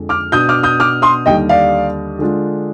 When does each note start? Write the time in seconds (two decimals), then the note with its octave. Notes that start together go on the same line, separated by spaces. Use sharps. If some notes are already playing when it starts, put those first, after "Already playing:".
Already playing: F2 D3 G#3
0.09 D6 F6
0.32 B2 B3 D4 D#6 G6
0.49 D6 F6
0.63 D#6 G6
0.80 D6 F6
1.02 C6 D#6
1.26 D#2 D3 G3 D#5 G5
1.49 D5 F5
2.19 D3 G#3 D4 F4